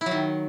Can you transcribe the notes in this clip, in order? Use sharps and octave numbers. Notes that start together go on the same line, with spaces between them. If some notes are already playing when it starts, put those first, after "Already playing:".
E4
F#3
D#3